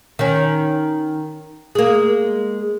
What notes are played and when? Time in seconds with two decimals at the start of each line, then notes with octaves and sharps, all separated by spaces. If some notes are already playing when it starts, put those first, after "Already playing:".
0.19 D#3 C#4
1.75 G#3 A#3